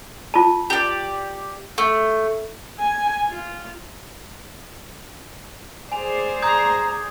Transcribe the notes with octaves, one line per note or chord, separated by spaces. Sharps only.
F4 A5
G4 D5
A3
G#5
F4
G#4 C5 D5 G#5 F7
A#5 D#6 G6 G#6